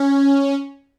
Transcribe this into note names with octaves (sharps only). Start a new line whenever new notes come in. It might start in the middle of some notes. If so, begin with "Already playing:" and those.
Already playing: C#4